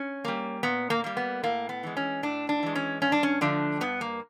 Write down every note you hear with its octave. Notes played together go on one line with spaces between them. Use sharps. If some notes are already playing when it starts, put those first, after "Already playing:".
Already playing: C#4
G3 A#3
A#2 B3
A#3
G3 A#3
B3
A2 A#3
B3
E3 G#3
C#4
A2 D4
D4
E3 G#3
C#4
G2 C#4
D4
C#4
D3 F3 A3 D4
G2 B3
A#3